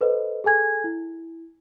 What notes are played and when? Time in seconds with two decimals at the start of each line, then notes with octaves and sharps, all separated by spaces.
0.01 A4 B4 C5 D#5
0.44 G#4 A4 G#5 G#6
0.84 E4